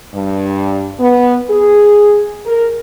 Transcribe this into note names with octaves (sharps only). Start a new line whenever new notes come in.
G2
B3
G#4
A#4